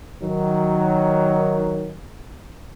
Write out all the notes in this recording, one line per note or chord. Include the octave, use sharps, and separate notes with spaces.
D#3 F#3